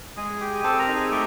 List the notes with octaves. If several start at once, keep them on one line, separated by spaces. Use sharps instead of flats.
G#3 G#4 G#5
G4
C4 A4 A5
A#4 A#5
D#4
G#4 G#5
A3 G4 G5